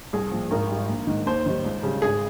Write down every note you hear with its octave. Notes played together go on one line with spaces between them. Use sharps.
C2 G#4
A#2 F3
G#1 A#4
G#2 G3
A#1
G#2 D#3
D#2 C5
D#3 G3
C#2
C#3 G3
G#1 G#4